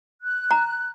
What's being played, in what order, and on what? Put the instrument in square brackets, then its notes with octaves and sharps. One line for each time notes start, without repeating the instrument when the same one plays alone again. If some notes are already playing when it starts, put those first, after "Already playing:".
[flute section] F#6
[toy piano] A#5